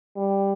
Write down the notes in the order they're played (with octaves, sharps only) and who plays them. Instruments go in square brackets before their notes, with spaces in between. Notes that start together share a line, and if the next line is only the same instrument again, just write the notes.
[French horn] G3